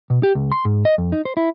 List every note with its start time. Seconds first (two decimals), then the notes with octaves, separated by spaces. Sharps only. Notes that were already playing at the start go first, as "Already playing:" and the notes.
0.10 B2
0.23 G4
0.35 C#2
0.52 C6
0.65 G#2
0.85 D#5
0.98 F2
1.12 D#4
1.25 C5
1.37 E4